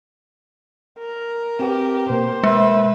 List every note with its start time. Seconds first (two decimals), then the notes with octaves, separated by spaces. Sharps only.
0.99 A#4
1.59 C4 G4 B4
2.10 B2 A#3 A#4 C5
2.44 G#3 B4 E5